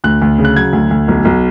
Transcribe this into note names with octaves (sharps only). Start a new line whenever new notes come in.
D2 F#6
D2
C#3
F#6
F#3 G#6
D2
D2
B1
B1